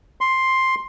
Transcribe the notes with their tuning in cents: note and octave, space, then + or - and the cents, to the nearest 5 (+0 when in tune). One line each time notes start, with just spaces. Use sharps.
C6 +5